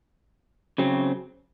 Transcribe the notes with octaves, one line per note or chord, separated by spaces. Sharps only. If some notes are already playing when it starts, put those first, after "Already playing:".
C#3 F#3 C4